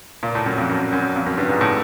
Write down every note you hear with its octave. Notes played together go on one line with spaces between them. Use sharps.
A#2
A2
F#2
F2
F#2
F#2
F2
F#2
G2
G#2
A2